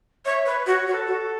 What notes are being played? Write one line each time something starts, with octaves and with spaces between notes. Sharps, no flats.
C#5 E5
B4 C#5
F#4 C#5
F#4 C#5
A4
F#4